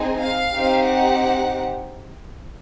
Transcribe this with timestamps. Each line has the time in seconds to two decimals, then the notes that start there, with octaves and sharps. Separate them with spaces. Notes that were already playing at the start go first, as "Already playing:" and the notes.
Already playing: C4 D#4 G#4
0.21 F5
0.54 C4 D#4 G4
0.88 F#5